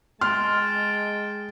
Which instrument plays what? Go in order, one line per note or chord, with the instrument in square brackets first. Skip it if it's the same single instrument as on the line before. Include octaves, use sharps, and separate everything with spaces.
[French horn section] G#3 [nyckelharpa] G5 A5 [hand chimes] C6 [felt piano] F6